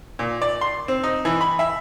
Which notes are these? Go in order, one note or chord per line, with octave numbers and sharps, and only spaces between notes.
A#2
D5
C6
C4
D#4
E3
B5
E5